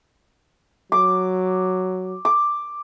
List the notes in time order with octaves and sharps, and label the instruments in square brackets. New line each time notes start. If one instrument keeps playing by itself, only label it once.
[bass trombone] F#3 [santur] D6
[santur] D6